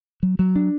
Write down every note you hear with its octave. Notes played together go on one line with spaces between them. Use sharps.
F#3
F#3
D4